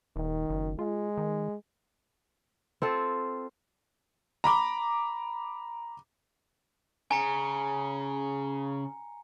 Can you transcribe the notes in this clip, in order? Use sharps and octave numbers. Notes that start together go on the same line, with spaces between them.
D#1 D#3
F#1
G#3 F4
D#3
C4 F4 A4
A#5 B5 D6
C#3 G#5 A#5 C#7